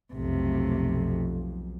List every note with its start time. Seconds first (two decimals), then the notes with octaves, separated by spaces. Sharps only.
0.14 B1 F2 C3 A3